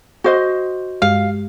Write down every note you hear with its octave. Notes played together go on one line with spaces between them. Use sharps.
F#4 C5 D#5
G2 G#3 G4 F5